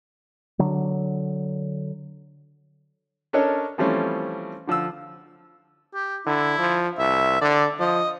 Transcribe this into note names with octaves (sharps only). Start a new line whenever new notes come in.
D3 F#3
C#4 D4 A4 A#4 C#5 D#5
E3 F3 G3 A3 C4 C#4
D3 F3 C5 E6
G4
D3 E4
F3
C2 E5
D3 D5
F3 D#5